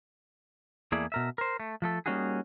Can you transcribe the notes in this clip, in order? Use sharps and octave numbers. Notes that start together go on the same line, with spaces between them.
E2 A3 A#3 E4 G#4 D5
B2 A#4 E5
A#4 C5
A3
F3 A3 A4
G3 A#3 C#4 D#4 F#4 G#4